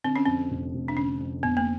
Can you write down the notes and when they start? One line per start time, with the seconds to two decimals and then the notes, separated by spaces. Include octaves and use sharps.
0.04 D3 C4
0.16 C#4
0.26 F2 C4
0.50 F1
0.74 F1
0.88 D4
0.97 D3 C#4
1.20 F2
1.43 F1 B3
1.57 A#3